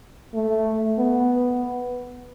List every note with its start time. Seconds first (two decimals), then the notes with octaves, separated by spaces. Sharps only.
0.34 A3
0.99 B3